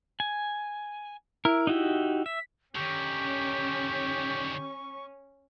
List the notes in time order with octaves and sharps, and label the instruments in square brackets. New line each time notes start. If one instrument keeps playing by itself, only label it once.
[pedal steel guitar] G#5
[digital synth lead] E4 [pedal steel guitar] A#4
[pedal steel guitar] D#4 F#4 G4
[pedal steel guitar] E5 [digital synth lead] B6
[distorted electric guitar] D3 D#3 [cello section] C#4 [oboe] G4 [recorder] C#6